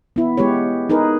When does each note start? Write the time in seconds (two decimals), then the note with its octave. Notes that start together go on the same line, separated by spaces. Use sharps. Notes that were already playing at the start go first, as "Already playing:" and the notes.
0.16 B3 E4
0.37 G#3 B3 G4 B4 C#5
0.89 D#4 G#4 A#4 B4